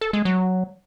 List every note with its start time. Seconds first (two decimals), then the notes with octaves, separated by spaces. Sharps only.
0.01 A4
0.13 G#3
0.25 F#3